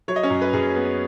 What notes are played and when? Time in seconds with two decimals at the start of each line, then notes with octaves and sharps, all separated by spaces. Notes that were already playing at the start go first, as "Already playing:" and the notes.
0.08 F#3 C#5
0.16 D#5
0.23 C#4 C#5
0.30 F#2
0.42 B4
0.53 F#2 G#4
0.76 B3